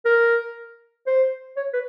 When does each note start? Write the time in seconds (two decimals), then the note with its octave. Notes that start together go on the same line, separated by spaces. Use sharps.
0.05 A#4
1.07 C5
1.57 C#5
1.73 B4